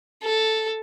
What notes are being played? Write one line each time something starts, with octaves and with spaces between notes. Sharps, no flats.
A4